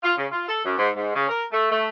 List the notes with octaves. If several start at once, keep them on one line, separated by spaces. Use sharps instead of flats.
F4
C#3
F4
A4
F#2
G#2
G#2
C#3
A#4
A3
A3